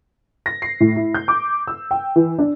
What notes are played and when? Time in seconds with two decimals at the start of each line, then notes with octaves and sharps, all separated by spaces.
0.46 A#6
0.62 C7
0.80 A2
0.96 E4
1.14 G6
1.28 D6
1.67 E6
1.91 G5
2.16 E3
2.39 D4